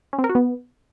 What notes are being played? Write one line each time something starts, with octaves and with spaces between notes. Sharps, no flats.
C#4
C4
A#4
F#4
B3